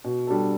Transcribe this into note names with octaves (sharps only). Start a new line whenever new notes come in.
B2
G3 D4 A4